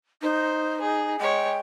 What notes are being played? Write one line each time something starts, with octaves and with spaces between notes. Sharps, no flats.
D#4 C5
G#4
G#3 C#5 G5